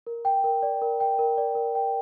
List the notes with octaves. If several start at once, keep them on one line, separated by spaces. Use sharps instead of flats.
A#4
G5
A#4
D5
A#4
G5
A#4
D5
A#4
G5